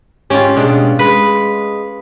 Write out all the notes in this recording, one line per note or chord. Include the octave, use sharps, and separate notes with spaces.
G#2 C#4 F4 G4
B2 G#3 D4
G#3 B4